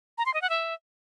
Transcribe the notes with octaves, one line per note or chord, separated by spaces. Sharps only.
A#5
C6
D#5
F#5
E5